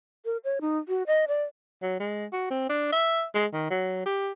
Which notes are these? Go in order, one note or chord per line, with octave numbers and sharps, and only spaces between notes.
A#4
C#5
D#4
F#4
D#5
D5
F#3
G#3
F#4
C4
D4
E5
G#3
D#3
F#3
G4